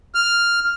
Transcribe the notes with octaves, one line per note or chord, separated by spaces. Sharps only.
F6